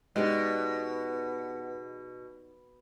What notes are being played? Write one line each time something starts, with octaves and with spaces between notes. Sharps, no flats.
B2 G#3 B3 D#4 G4 D5